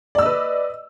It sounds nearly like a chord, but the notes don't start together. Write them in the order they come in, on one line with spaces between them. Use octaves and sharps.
D5 E6 D#5 B4